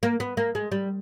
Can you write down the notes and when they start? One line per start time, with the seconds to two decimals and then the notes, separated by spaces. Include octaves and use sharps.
0.03 A#3
0.20 B3
0.37 A#3
0.55 G#3
0.72 G3